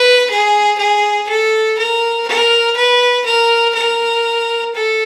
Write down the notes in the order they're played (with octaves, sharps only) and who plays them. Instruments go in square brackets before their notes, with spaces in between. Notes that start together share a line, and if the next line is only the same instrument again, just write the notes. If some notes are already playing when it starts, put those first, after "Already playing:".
Already playing: [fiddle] B4
G#4
G#4
A4
A#4
A#4
B4
A#4
A#4
A4